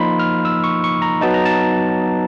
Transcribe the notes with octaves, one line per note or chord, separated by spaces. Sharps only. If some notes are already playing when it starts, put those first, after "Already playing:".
Already playing: F3 A#3 D#4 B5 C6
F6
E6
C#6
C#6
A#5
F#3 B3 D#4 A5
A#5
A5